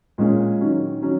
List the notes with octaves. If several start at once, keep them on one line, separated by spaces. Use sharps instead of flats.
A#2 G#3 C#4
D#3 F#3 C#4
D#3 F#3 C#4